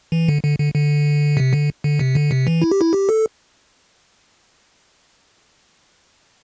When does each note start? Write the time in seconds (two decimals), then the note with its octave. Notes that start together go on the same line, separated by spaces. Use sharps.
0.12 E3
0.28 D3
0.43 D3
0.59 D3
0.74 D3
1.37 C3
1.53 D3
1.84 D3
1.99 C3
2.15 D3
2.31 C3
2.47 E3
2.62 E4
2.71 G4
2.81 E4
2.93 G4
3.09 A4